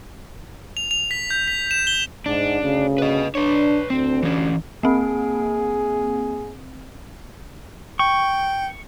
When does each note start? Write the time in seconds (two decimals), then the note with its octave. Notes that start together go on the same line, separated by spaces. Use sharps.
0.77 F7
0.91 F7
1.11 B6
1.31 G6
1.48 B6
1.71 E7
1.87 G7
2.26 G#2 D4
2.61 D2 C#3
2.98 B4 D#5
3.35 D4 B4 C#5
3.90 D2 C4
4.23 E3 C#4
4.83 A#3 C4 G#4
7.99 G5 C#6